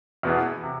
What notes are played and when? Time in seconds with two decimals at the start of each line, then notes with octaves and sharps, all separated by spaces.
0.23 E2 B2 B3 E4 G#4
0.63 C3